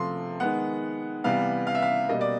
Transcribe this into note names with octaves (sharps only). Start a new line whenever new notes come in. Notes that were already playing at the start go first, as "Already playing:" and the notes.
Already playing: C3 F3 A3 C6
D#3 G#3 B3 F#5
C3 E3 G3 B3 F5
F5
E5
F5
B2 G3 A#3 D#5
D5